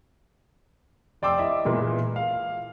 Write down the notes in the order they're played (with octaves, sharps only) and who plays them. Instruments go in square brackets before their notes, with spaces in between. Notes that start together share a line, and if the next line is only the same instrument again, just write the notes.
[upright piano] F1 D5 G5 C6 D6 E6
E4 D#5 E5
A#2 E3 G#3 A#3
F5